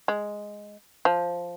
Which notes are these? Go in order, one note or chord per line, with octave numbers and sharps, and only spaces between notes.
G#3
F3